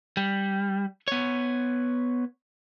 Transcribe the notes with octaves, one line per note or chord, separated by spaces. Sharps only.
G3
B3 C#5